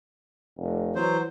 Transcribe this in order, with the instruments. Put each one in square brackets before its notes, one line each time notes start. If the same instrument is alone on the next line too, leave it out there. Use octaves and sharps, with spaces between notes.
[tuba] F1
[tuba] E3 [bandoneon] F#3 C5